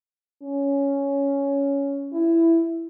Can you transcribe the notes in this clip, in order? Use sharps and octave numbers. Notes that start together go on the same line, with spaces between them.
C#4
E4